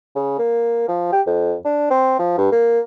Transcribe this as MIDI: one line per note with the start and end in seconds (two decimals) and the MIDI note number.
0.16 0.37 49
0.39 0.85 58
0.89 1.10 53
1.12 1.22 67
1.27 1.55 41
1.65 1.90 62
1.91 2.16 60
2.19 2.35 53
2.38 2.50 43
2.52 2.80 58